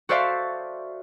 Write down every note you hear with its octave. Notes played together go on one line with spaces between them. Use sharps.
F#4 A4 C5 D5 E5 F5